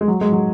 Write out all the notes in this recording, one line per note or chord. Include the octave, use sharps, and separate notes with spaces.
G#3
F#3
G#3
F#3